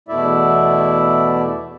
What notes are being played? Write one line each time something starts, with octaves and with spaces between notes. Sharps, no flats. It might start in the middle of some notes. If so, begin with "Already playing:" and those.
E2 B2 A3 E4 D5 E5